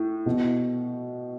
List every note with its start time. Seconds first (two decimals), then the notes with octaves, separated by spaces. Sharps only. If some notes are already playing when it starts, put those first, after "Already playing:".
Already playing: A2
0.26 B2